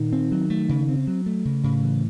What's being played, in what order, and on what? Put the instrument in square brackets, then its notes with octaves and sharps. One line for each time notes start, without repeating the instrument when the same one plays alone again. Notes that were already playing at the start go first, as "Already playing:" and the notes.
Already playing: [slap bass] A#2 [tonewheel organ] D#3
[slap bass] C4
F#3
A3
C#3
C4
F#3
A3
C#3
[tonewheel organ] A2 [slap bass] C#3
[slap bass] E3